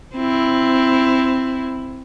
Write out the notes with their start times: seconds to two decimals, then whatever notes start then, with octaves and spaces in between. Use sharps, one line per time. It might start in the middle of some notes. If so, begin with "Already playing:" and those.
0.16 C4 E4